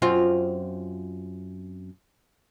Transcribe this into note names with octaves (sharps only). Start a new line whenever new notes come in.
F#2 C4 F4